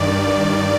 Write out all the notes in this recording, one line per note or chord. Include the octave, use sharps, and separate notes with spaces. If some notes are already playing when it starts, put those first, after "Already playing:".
Already playing: G2 D#3 D5